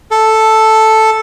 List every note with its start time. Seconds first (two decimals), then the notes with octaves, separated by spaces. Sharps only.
0.11 A4